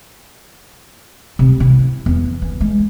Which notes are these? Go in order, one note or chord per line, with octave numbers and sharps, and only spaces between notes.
C3
E4
E2
E3
G#3